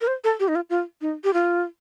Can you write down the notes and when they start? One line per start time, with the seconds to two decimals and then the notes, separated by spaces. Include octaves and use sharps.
0.01 A#4
0.07 C5
0.24 A4
0.40 G4
0.48 D#4
0.55 F4
0.70 F4
1.01 D#4
1.24 G4
1.34 F4